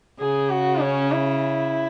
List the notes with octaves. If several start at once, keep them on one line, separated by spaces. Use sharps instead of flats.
C#3 G#4
F#4
C#4
E4